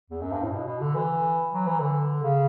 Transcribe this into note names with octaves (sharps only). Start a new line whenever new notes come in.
E2
F#2
G2
A2
B2
B2
D3
E3
F#3
E3
D3
C#3